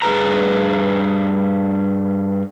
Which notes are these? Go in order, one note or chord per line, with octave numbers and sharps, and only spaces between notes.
G2 G#4 B4 A#5